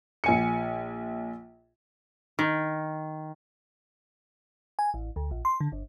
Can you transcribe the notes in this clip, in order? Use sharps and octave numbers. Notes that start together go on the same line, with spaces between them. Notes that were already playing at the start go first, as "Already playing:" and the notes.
A#1 G#5 C#7
D#3
G#5
A1
D2
A#1
C6
D3
G1